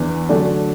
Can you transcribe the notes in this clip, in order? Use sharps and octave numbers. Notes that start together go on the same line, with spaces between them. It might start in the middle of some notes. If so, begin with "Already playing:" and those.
Already playing: E2 E3 D4
D3 F#3 A3 D4